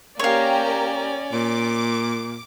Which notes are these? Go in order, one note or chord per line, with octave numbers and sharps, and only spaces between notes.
A#3 C#4 G4 C#5 D5 F5 A#5
A#2 D6